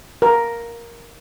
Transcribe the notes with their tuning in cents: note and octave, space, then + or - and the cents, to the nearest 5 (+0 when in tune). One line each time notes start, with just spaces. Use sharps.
A#4 +5